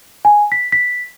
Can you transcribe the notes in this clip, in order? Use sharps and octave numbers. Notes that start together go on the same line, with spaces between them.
G#5
B6
B6